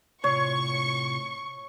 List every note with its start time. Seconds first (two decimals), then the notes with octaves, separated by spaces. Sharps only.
0.24 A2 C3 F4 C#5 C#6